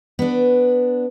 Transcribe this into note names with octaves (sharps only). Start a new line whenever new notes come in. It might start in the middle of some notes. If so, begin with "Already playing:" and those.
B3 D4